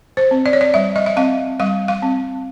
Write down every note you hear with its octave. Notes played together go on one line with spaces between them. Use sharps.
C5
C4
D5
C#5
D5
G3 E5
D#5
E5
C4 F5
G3 F5
F5
C4